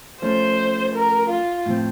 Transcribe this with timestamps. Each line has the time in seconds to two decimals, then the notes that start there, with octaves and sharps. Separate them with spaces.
0.22 F3 A3 C#4 C5
0.95 A#4
1.30 F4
1.66 A2 F3 C4